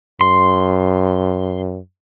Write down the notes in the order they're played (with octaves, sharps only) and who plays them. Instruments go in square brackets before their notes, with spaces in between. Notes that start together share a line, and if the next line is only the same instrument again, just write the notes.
[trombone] F#2 [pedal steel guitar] C6